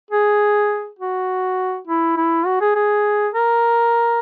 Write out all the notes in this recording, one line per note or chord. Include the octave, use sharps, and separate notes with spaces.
G#4
F#4
E4
E4
F#4
G#4
G#4
A#4